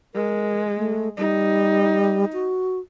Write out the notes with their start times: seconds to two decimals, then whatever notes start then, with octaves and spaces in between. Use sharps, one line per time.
0.15 G#3 A#4
0.77 A3
1.17 G3 D#4
2.33 F#4